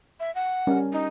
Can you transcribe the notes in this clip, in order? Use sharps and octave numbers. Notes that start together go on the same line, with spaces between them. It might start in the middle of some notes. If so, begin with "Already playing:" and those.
E5
F#5
G3 C#4 A#4
D#4